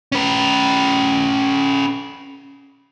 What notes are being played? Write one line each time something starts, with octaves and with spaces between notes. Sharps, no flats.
C#4 B4